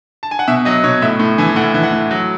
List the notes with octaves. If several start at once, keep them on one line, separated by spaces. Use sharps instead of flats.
A5
G#5
F#5
B2 E5
F#3 D#5
B2 C#5
A2 E5
A2
E3 G#5
A2 F#5
E3
F#5
A2
F#3